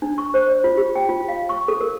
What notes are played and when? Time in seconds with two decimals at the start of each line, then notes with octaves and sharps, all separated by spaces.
0.02 D4
0.18 C#6
0.34 C5
0.48 D5
0.64 F4
0.77 G4
0.96 G5
1.09 F4
1.28 F5
1.49 C#6
1.68 A4
1.81 A#4